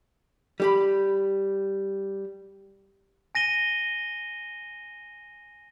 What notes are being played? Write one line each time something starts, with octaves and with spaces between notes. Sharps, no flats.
G3 G4 B5
G#5 A#6 D#7 G7